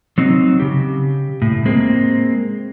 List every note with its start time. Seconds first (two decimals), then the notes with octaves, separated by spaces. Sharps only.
0.18 F#3 C4 D#4
0.60 C#3 G4
1.42 A2
1.65 G#3 A#3 C4 G#4